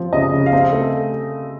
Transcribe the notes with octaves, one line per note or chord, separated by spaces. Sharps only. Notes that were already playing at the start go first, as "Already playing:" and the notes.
Already playing: F3 C4
C#3 D#5
C#3
F5
C4 D#5
A3